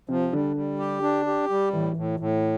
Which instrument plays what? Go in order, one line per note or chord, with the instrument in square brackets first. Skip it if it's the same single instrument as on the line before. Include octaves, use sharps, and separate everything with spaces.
[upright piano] C3 [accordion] F3
[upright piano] D3 [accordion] G3
[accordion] G3
G4
D4
G4
G3
[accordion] A2 [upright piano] E3
[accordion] A2
A2